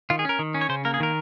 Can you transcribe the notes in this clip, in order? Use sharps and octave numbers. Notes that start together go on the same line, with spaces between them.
D#3 F4
G#4
C#4 A#4
D#3
C#4
C#5
C#3 C5
A#3 A#4
G#4
D#3 A#4